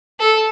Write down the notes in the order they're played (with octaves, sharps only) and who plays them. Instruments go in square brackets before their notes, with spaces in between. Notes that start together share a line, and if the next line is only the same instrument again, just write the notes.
[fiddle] A4